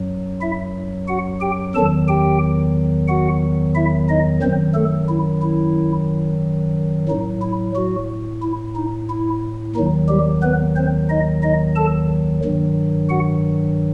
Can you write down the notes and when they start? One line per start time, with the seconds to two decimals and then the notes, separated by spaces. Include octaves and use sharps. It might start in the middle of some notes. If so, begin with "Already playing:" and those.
Already playing: F#2 F#3
0.41 E4 E5
1.08 F#4 F#5
1.41 G4 G5
1.75 E2 D#3 F#3 A4 A5
2.08 G4 G5
3.08 F#4 F#5
3.75 E4 E5
4.09 D#4 D#5
4.42 F#2 D#3 F#3 C4 C5
4.75 A3 A4
5.09 E4
5.42 E4
7.08 A2 F#3 D#4
7.42 E4
7.75 F#3 F#4
8.42 E4
8.75 D#4
9.10 E4
9.75 D#2 D#3 F#3 D#4
10.09 G3 G4
10.43 B3 B4
10.76 C4 C5
11.09 D#4 D#5
11.43 D#4 D#5
11.76 A4 A5
12.43 G2 D#3 F#3
13.09 F#4 F#5